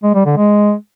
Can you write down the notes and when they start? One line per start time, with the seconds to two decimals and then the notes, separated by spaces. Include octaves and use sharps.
0.03 G#3
0.14 G3
0.25 D3
0.37 G#3